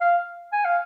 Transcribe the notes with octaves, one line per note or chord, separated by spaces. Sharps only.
F5
G#5
F5